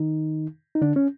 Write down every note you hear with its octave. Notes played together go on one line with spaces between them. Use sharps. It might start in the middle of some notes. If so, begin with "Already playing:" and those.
Already playing: D#3 D#4
D#4
D3 D4
C#4